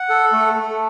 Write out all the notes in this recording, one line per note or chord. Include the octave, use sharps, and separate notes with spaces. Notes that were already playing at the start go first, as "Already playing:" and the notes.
Already playing: F#5
A4
A3
A3